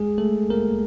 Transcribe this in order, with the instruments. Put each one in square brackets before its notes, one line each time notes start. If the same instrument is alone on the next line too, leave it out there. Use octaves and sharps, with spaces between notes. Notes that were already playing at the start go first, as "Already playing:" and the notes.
Already playing: [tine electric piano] G#3 G#4
A3 A4
A#3 A#4